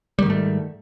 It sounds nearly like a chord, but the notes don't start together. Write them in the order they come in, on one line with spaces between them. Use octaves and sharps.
G3 D#3 G#2 A3